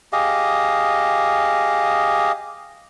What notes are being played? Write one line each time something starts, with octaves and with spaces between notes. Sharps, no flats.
G4 G#4 D#5 F5